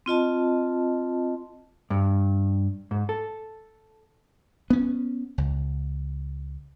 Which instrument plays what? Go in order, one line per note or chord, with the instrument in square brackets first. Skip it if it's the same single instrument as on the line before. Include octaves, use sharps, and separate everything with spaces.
[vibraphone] C4 F4 D#5 A5
[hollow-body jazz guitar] G2
G#2
A4
[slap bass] B3 C#4
C#2